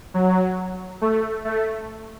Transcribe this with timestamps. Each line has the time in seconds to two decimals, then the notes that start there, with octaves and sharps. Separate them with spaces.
0.14 F#3
1.02 A3
1.45 A3